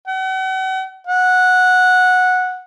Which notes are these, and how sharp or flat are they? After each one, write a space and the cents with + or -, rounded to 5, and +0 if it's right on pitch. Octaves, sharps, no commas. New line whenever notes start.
F#5 +40
F#5 -10